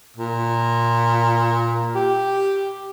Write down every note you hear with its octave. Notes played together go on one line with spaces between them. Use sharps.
A#2
G4